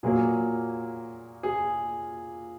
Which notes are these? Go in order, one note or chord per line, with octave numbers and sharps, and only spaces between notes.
A#2 F#3 A#3 G#4
G#4